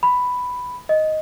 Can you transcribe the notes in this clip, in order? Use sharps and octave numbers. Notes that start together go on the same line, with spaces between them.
B5
D#5